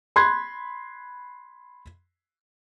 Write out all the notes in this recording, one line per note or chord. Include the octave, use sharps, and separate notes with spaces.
B5 C6 F#6 G#6